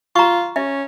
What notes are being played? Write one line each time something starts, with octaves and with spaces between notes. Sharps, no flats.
F4 A#5 C#6
C#4 E5